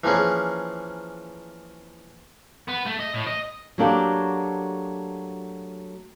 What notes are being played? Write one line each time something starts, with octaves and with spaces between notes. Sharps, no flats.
E3 F3 A#3 C#4 G#4
B3
A3
D#5
A2
D#5
F#3 A3 A#3 D4 F#4 G4